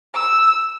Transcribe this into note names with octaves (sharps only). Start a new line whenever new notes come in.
E6